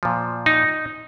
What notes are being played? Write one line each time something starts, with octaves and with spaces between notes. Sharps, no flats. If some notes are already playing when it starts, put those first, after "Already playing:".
A#2 F3
D#4